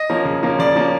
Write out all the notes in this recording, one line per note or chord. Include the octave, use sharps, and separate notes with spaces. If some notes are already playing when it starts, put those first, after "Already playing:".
Already playing: D#5
F3 A#3 C#4
C#3
F3 A#3 C#4
C#3 D5
F3 A#3 C#4